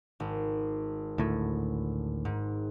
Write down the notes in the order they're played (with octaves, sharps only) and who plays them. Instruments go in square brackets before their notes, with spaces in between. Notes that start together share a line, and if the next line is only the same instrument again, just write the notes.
[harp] G#1
[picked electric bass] D2 A2
[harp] G#2